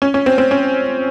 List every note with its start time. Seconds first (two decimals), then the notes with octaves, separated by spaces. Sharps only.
0.02 C#4
0.14 C#4
0.26 C4
0.38 C4
0.51 C#4